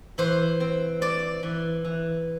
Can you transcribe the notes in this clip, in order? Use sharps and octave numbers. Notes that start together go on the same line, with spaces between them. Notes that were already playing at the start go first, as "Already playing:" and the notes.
E3 C5
C4
C4 D5
E3
E3